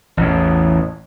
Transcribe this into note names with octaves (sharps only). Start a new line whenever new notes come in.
A1 E2